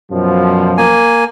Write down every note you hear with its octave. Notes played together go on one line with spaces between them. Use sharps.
F#2 B2 F3
A#3 G#5